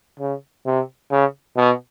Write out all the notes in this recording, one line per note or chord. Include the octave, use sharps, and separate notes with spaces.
C#3
C3
C#3
B2